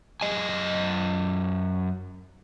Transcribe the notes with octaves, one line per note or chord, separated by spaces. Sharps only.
F#2 D#5 G#5